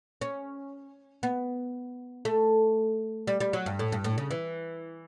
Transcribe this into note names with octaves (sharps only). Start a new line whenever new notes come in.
C#4
B3
A3
G3
G3
F#3
G2
A2
G2
A2
C#3
E3